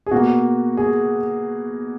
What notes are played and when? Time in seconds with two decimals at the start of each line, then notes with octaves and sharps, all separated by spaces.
0.06 G#4
0.11 B2 A#3 F#4
0.77 G#4